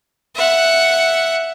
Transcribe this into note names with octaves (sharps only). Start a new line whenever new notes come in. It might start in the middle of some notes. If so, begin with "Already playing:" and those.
E5 F#5